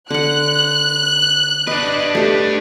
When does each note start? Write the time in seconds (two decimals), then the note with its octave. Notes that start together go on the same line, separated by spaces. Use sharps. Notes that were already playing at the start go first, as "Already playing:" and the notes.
0.10 D3 F#5 F#6
1.67 D4 B4 D#5
2.15 A3 G4